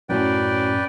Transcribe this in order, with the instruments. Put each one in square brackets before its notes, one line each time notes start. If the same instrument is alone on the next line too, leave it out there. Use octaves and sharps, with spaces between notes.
[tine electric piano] F#2 A2 F#3 [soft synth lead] C#4 [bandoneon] B4 D5 G5